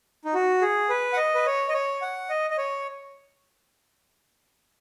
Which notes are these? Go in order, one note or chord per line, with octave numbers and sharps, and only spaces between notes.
D#4
F#4
G#4
B4
F#5
D#5
B4
C#5
D#5
C#5
F#5
D#5
D#5
C#5